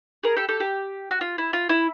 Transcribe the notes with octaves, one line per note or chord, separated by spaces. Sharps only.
G#4 A#4
G4 A4
G4 A4
G4
F#4
F4
E4
F4
E4